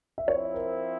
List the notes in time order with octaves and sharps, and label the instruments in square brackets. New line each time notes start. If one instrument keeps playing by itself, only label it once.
[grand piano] E5
[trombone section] F3 C4 E4 [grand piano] C#5
[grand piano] A#4